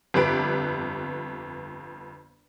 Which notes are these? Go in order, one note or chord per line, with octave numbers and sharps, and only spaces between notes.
G1 F2 G4 B4 D7